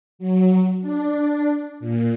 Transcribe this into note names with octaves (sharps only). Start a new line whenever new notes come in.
F#3
D4
A#2